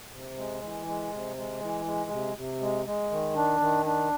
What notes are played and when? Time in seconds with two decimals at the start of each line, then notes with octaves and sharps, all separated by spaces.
0.12 C3
0.37 G#3
0.62 E3
0.86 G#3
1.12 C3
1.37 G#3
1.61 E3
1.86 G#3
2.10 C3
2.36 C3
2.61 G#3
2.86 G#3
3.11 D#3
3.36 D4
3.60 D#3
3.86 D4